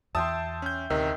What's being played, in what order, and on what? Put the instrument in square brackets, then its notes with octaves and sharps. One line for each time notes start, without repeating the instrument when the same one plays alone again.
[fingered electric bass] E2 E3 [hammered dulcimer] E5 G5 C6 [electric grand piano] A5 D#6
[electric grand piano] C#4 G6
[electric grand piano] A1 C3 E6 [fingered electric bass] D2 [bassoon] D#3